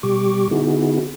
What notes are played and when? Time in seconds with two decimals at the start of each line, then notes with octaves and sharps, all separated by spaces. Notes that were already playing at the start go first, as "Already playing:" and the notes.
0.03 B2 G3 G4 C#6 D6
0.51 D3 B3 D#4 E4 F#4 G#4